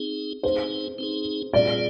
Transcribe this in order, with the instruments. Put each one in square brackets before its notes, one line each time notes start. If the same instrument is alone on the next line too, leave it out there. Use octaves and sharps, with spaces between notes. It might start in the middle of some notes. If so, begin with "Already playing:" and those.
Already playing: [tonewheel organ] C4 D#4 G#4
[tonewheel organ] C4 D#4 G#4 [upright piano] C5
[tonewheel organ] C4 D#4 G#4
[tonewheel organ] A#2 G3 C4 F4 G#4 [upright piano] D5